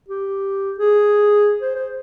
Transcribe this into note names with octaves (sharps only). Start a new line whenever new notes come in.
G4
G#4
C5
C5